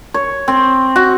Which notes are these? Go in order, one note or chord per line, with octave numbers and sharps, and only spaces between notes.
C#5
C4
F#4